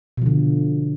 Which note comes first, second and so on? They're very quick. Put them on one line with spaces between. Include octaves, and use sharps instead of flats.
B2 F3 D3